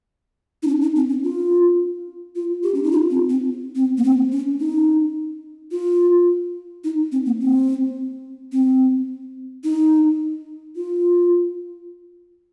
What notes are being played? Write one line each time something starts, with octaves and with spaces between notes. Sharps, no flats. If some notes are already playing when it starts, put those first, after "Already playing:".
D#4
C#4
D#4
C4
C#4
F4
F4
G4
C#4
D#4
F4
C4
C4
C4
A#3
C4
C#4
D#4
F4
D#4
C4
A#3
C4
C4
D#4
F4